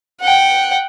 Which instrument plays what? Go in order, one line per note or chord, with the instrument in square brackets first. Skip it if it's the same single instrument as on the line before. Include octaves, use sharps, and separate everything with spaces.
[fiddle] F#5 G5